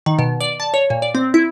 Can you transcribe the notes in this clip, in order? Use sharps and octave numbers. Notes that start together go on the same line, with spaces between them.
D#3
B2
D5
A5
C#5
A#2
D5
C4
E4